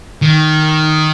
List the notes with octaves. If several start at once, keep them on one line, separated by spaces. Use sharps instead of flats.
D#3